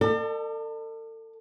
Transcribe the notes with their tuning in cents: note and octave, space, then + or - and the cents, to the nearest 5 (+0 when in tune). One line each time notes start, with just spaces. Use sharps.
A4 +40 D5 +40 A5 +0